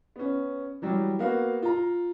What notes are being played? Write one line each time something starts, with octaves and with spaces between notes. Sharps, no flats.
B3 C#4
E3 F#3 G3
A#3 B3 F#4 F5
F4 A#5